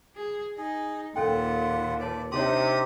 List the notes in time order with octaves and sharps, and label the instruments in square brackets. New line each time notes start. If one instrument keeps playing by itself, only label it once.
[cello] G#4
[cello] D#4 [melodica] G#4
[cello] D#2 A#2 [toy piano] C#4 A4 G5 [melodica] F4 F#5
[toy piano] B4 C#5 A5 [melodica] D5
[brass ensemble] C3 [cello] D4 D#4 [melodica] G4 D#6 [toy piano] C#5 C6